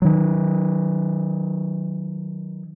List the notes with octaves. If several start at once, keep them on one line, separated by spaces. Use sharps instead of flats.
D#3 F#3